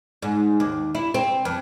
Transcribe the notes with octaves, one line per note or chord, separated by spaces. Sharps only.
G#2
D#2
E4
C4
F2